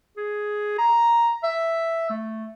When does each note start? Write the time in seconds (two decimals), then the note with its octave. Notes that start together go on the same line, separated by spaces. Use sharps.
0.17 G#4
0.78 A#5
1.44 E5
2.10 A3